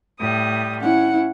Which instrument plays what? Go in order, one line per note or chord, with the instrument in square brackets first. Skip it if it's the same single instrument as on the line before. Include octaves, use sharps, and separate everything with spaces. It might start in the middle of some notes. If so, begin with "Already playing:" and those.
[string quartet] A2 G3 D#6
[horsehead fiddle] C#4 E4 [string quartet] F#5